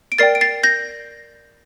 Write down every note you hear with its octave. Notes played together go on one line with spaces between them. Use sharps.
D7
A#4 D5 G5 A6 C7
D7
A6 C7
G6 A#6